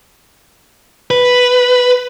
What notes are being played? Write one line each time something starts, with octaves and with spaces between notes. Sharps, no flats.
B4